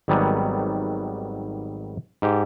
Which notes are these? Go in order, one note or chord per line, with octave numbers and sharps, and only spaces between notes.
G#1 D#3 F#3 G3 B3 G#5
G#2 G4